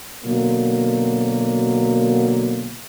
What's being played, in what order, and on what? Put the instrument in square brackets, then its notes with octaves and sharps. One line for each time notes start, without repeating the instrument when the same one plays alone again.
[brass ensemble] B2 D3 F#3 A#3